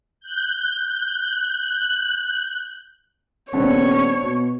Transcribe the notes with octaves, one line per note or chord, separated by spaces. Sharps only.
F#6 G6
D#1 B3 C4 D4 C#5
B2